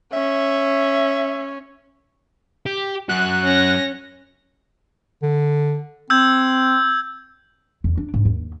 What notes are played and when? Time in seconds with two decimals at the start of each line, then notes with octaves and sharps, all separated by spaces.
0.13 C#4 E5
2.66 G4
3.09 F#2 F#4 F#6
3.44 C#4 A#6
5.22 D3
6.10 C4 E6 G6 G#6
7.84 E2
7.97 D4
8.14 G#2
8.25 D#2